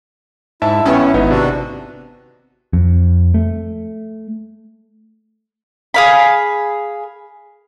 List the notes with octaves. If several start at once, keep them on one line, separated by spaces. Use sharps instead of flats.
G#2 E4 E5 A5
A1 B3 C#4
G#1 B3 D#4
C3 D4 F#4
F2
A3
G#4 F5 B5